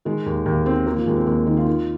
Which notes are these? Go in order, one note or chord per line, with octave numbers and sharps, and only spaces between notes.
D#3 G#3
D#2
D#2
D#3 C4
D#3 A#3
F3
D#2 G#3
C4
D#2 A#3
D#3 D#4
F4
D#3